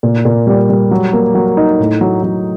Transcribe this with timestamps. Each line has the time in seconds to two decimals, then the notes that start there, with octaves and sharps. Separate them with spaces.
0.03 A#2
0.25 A#2
0.47 G3
0.70 G3
0.91 F#3
1.13 A#3
1.35 F#3
1.57 D#4
1.80 A2
2.01 F#3
2.23 F#3